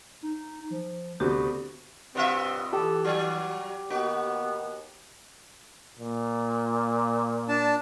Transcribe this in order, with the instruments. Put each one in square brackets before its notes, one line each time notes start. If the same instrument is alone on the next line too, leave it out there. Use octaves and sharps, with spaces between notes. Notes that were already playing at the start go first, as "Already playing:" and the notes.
[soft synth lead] D#4
F3
[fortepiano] D2 C3 B3 [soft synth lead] F#4 [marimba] G4
[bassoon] G2 [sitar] B2 F4 E5 [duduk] C4
[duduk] E3 [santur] G4 [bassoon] A4
[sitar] F#3 [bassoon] F#4
[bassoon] D#2 [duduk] B3 [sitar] F#4
[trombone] A#2
[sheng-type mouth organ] D4 A5